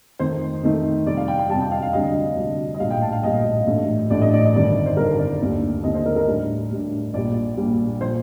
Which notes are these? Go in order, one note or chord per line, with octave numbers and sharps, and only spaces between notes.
F2 D#3 A3 D#4 C5
F2 D#3 A3 D#4
F2 C3 G3 D5
F5
G5
G5
F2 C3 G3 A5
G5
F5
F5
D2 C3 G3 D4 D#5
D2 C3 G3 D4
D#5
A#1 A2 G3 F5
G5
A5
F5
A#1 A2 G3 D#5
A1 A2 A3 D4
A1 A2 A3 D4 D5
D#5
D5
D#5
G1 F2 D#3 G3 D5
C5
G1 F2 D#3 G3 A#4
D5
D#2 D3 A3 C4 D#4
D#2 D3 A3 C4 D#4 D#5
C5
A#4
A#4
A2 G3 D4
A2 G3 D4
A#1 A#2 G3 D5
A#1 A#2 G3
A#2 F3 C5